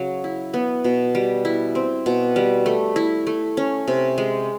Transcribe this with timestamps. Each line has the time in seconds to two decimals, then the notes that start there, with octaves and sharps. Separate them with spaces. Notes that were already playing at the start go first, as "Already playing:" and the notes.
Already playing: C#3 F#3
0.24 E4
0.54 B3
0.84 B2
1.15 G3
1.45 E4
1.75 C4
2.06 B2
2.36 G3
2.66 A3
2.96 E4
3.27 A3
3.57 C#4
3.88 C3
4.18 G#3